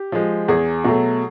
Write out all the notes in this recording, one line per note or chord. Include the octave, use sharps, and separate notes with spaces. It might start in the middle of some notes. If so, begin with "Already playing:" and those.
Already playing: G4
F3 G#3
E2 G#4
B2 F#3 A3